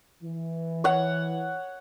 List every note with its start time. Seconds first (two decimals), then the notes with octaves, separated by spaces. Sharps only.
0.23 E3
0.84 C#5 F#5